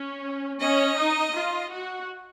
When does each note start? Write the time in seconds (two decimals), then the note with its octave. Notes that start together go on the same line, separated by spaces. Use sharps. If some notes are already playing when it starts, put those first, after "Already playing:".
Already playing: C#4
0.60 C#4 D#5
0.97 D#4
1.35 F4
1.71 F#4